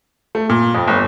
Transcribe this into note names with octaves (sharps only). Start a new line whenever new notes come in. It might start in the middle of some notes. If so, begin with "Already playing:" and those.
A3
A#2
F2
G1